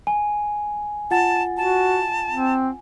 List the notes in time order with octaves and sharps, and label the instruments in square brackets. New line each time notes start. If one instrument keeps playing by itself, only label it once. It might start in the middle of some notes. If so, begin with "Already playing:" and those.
[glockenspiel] G#5
[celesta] F4 F#5 A6 [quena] A5
[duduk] F#4 [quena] A5
[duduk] C4